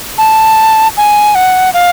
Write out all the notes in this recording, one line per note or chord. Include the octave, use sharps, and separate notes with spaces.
A5
G#5
F#5
F5